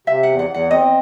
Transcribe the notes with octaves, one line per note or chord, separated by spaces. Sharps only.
C3 E5
E2 F#5
F#5
E2
F#5
C4 D#5